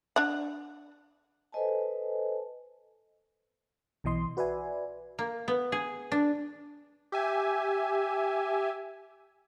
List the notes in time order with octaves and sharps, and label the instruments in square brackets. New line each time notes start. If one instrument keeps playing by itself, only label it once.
[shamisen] D4 F#5
[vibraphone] A4 B4 C5 D#5 G#5 A5
[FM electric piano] B1 B2 E3 D#5 C6
F#4 B4 D5 E5 G#5
[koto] A#3
B3
G#4
D4
[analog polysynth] G4 E5 G#5